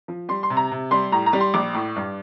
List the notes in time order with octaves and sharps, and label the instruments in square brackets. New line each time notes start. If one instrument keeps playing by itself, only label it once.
[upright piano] F3
G3 C6
C6
C3
A#5
C3
G3 C6
A2 A#5
A#5
G3
C6
A#1 D6
A2
G2